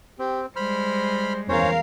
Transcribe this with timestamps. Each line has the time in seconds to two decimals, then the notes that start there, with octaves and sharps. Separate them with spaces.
0.19 C4 G4
0.56 G3 G#3 C5 B5 F6
1.49 E2 C#4 A#4 C5 C#5 F5